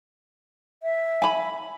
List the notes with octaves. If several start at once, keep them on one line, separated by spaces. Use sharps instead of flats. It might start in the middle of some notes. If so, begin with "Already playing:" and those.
E5
G#5 B5